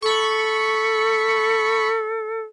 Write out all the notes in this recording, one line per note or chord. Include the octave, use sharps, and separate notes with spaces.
A4 B5 C#6